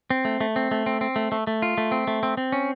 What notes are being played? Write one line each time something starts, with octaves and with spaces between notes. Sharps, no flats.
C4
A3
A3
C4
A3
C4
C4
A3
A3
A3
F4
A3
C4
A3
C4
C4
C#4